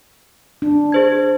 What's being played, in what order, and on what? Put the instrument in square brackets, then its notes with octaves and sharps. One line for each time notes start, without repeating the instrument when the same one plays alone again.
[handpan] D4
[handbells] G#4 C5 G#6